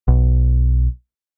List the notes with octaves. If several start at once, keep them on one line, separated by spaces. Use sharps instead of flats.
B1